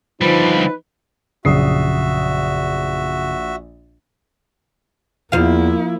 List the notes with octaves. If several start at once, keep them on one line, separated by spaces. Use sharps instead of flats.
D3 F3 G3 D#4 B4
A#1 F#2 C#3 F#4 E5 D#6 C7
E2 F3 A#3 E4 F5